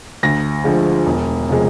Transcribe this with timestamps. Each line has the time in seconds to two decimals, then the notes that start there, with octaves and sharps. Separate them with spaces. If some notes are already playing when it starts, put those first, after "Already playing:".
0.23 D2 A#6
0.64 D3 F3 G#3
1.06 E1
1.50 C3 F3 G#3